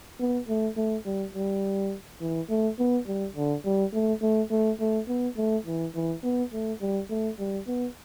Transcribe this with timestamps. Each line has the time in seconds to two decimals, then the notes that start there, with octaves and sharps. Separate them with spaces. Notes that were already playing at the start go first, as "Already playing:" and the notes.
0.20 B3
0.49 A3
0.77 A3
1.06 G3
1.35 G3
2.21 E3
2.49 A3
2.79 B3
3.07 G3
3.36 D3
3.65 G3
3.93 A3
4.22 A3
4.51 A3
4.80 A3
5.08 B3
5.37 A3
5.66 E3
5.95 E3
6.24 B3
6.53 A3
6.81 G3
7.10 A3
7.39 G3
7.67 B3